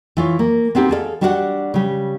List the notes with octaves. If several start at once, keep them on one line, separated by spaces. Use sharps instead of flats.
E3 F4 C#5
A#3
B3 C4 D#4 G4
G#4 A4 D5 F5
G3 D4 F#4 G4 E5 F#5
C#3 G3